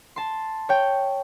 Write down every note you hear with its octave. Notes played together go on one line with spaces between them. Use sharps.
A5 C6
C#5 G5